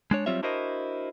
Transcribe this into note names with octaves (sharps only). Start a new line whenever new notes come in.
G#3 D4 C#5
F#3 G3 C4 F4 C#5 E5
D4 E4 F#4 A#4 C5 D#5